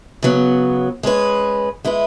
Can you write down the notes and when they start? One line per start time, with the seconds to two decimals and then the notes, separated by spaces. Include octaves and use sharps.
0.23 C#3 F#3 B3
1.03 G#3 C#4 G#4 B4
1.85 G#3 E4 B4